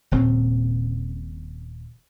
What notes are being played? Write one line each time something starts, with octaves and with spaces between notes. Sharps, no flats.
D#1 A#2 C#3 C4